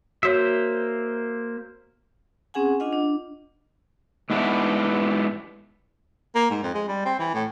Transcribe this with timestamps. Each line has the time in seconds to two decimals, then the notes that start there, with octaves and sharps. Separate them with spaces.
0.23 A#3 F#4 C5 C#5 E5
2.54 C4 C#4 G#4 F#5 G#5
2.80 D4 F4 D#5 F#5
2.93 D4
4.30 G#2 E3 B3 D4 E4
6.35 A#3
6.50 G#2
6.62 F2
6.74 G#3
6.88 G3
7.05 C4
7.19 E3
7.34 A2